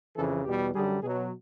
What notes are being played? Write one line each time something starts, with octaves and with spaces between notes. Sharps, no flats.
F2 C#3 E3 A4
E2 B2 G3 G4
F#2 D3 G3 G#4
B2 F#3 G#4